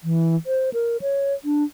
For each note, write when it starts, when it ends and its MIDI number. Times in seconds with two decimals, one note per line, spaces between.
0.04 0.36 52
0.46 0.70 72
0.74 0.97 70
1.02 1.34 73
1.45 1.63 62